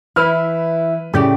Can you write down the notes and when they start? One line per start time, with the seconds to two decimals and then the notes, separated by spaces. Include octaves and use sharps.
0.16 E3 E4 B4 F6
1.14 A2 C#3 G4 D5